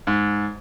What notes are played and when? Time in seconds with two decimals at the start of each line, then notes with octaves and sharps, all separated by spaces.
0.07 G#2